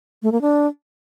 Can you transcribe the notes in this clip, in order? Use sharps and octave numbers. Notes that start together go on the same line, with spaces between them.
A3
A#3
D4